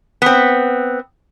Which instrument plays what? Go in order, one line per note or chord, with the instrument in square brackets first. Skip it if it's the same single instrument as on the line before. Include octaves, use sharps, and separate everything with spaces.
[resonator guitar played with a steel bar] B3 C4